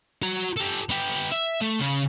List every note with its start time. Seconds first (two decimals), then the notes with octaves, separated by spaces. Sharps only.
0.22 F#4 A#5
0.56 G4 A4
0.89 B3 G4
1.32 E5
1.62 A3
1.80 C#3